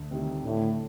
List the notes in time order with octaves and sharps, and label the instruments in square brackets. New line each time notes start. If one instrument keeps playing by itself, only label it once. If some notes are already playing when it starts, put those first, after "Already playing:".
Already playing: [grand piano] D2
C3 D#3 G3
[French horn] A2 [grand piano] D3